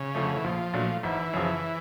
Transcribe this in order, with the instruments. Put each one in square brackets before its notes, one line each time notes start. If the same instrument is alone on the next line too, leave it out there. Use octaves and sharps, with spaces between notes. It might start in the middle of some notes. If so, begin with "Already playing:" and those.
Already playing: [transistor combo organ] C#3
[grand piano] F2 D3 F3 A3
[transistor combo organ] E3
[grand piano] A#1 [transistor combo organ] F3
[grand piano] A#2 F#3 A3 D4
[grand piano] G#1 [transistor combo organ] E3
[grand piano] F#2 C#3 F3